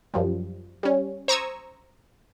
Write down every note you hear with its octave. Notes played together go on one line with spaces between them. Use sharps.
F#2 F3 G3
G3 C#4
C5 A#5 C#6 D#6 E6 G#6